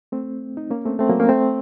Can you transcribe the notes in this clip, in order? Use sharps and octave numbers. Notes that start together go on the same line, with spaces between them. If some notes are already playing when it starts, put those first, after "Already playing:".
A3 C4
D#4
A#3 C#4
A3 C4
A3 C4
F#3 A#3
A#3 C#4
A3 C4